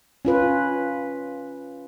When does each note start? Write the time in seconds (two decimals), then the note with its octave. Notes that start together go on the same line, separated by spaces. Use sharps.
0.25 C#4 F4 B4